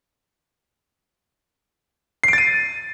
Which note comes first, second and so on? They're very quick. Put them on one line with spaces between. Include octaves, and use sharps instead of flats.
C7 D7 A6 D#7